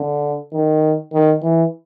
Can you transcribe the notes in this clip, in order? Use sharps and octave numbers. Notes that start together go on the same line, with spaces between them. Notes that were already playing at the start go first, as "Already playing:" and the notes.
Already playing: D3
D#3
D#3
E3